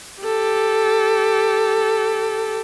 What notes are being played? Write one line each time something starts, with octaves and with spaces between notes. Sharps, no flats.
G4 A4